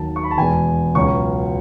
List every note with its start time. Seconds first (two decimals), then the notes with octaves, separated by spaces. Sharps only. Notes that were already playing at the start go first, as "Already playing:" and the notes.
Already playing: D#2 D#3 F#3 A5
0.16 C#6
0.24 B5
0.31 A5
0.37 E2 B2 G#3 B3 G#5
0.95 C#2 B2 F#3 C#4 C#6